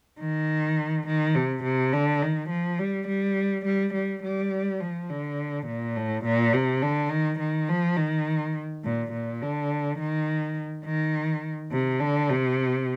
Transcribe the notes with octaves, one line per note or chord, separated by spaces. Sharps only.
D#3
D#3
C3
C3
D3
D#3
F3
G3
G3
G3
G3
G3
F3
D3
A#2
A2
A#2
C3
D3
D#3
D#3
F3
D#3
A#2
A#2
D3
D#3
D#3
C3
D3
C3